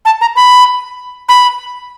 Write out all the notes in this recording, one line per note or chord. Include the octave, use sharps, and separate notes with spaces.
A5
A#5
B5
B5